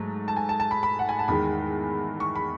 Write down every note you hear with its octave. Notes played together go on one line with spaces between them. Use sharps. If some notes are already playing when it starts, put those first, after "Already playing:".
Already playing: G#2 F#3 A3
A5
G#5
A5
A5
B5
B5
F#5
G#5
A5
E2 D#3 G#3 B5
C#6
B5